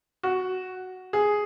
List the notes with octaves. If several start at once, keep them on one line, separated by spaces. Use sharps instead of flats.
F#4
G#4